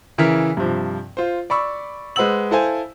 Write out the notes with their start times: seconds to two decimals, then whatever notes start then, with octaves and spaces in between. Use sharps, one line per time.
0.18 C#3 E3 E4 A#4 F6 B6
0.57 G2 C3 F3
1.17 F4 C5
1.50 D5 B5 C#6 E6
2.16 G#3 B4 C5 F#5 E6 F#7
2.51 E4 A4 C5 F5 G#5